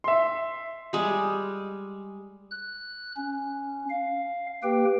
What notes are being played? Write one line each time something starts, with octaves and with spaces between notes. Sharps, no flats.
E5 C6
G3 G#3
F#6
C#4
F5
A#3 G4 B4 G5